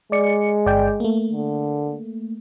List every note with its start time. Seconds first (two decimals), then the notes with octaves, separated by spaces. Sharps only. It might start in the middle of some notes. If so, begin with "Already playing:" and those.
0.12 G#3 D5 C#7
0.66 G1 D5 G5
1.00 A3 A#3
1.32 D3